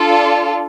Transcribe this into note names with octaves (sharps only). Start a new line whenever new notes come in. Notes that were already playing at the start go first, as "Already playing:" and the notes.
Already playing: D4 F4 A4